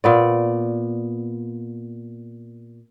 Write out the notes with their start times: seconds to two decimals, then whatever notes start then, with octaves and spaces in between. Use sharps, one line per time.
0.04 A#2 B3 D5